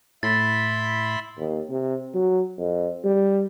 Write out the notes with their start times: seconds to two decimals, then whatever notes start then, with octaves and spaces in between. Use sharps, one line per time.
0.23 A2 E4 B5 C6 A6
1.38 D#2
1.70 C3
2.14 F#3
2.58 F2
3.04 G3